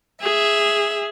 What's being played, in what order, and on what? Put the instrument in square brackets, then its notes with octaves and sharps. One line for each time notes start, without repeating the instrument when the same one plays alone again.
[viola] G#4 [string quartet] E5